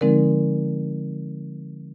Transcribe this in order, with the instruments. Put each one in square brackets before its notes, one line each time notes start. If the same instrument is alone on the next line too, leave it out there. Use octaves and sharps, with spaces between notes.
[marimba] D3 F3 G#3 C4 D#4 A#4